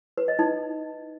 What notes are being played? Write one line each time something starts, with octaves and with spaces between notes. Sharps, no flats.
B4
D#5
D#4